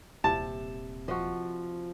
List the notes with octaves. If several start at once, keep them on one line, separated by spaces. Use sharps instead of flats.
D#1 C3 A5
F3 F#4 D#5